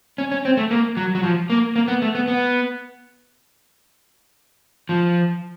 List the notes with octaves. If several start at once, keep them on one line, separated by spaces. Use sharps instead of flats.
C#4
C#4
C4
A3
A#3
F#3
F#3
F3
A#3
A#3
B3
A3
B3
B3
F3